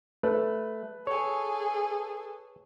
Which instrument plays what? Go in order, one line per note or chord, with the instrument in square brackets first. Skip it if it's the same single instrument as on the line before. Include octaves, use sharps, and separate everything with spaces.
[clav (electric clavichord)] A3 [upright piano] B4
[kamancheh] G#4 A4 [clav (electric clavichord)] C#5